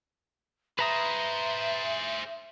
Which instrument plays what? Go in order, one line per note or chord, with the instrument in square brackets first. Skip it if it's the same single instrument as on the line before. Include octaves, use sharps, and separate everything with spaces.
[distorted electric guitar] G#4 C5 [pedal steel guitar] B4 A#5 D#6 [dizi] E5